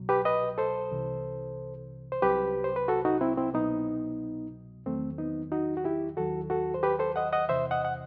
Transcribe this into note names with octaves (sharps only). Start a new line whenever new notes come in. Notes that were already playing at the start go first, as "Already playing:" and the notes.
Already playing: C2 B2 F#3
G4 B4
B4 D#5
A4 C5
C2 C3 E3
C5
C2 C3 F#3 G4 B4
C5
B4
F#4 A4
D#4 F#4
C4 E4
C4 E4
C2 B2 F#3 B3 D#4
E2 D#3 F#3 A3 C4
B3 D#4
D#4 F#4
F#4
E4 G4
D#2 D#3 F#3 F#4 A4
F#4 A4
C5
G4 B4
A4 C5
D#5 F#5
D#5 F#5
E2 C3 E3 C5 E5
D#5 F#5
F#5